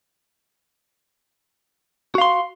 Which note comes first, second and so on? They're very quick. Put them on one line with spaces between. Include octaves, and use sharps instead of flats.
F#4 F5 C6